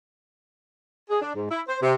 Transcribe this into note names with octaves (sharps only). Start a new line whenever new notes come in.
G#4
D4
G#2
E4
C5
C3